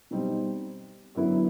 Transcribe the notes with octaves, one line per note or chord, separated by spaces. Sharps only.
B2 G3 C4 D#4
F#2 D3 F#3 B3 E4